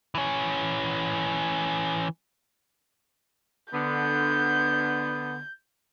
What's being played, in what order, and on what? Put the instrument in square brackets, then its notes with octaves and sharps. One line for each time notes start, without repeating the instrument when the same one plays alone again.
[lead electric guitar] E3 C#4
[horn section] D3 B3 [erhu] G6